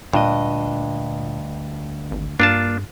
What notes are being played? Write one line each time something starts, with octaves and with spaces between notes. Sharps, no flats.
D2 G2 A#2 D4 D#5
G#1
G2 A#3 D4 F4 A5